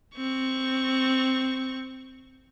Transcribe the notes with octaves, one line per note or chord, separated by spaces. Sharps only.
C4 C#6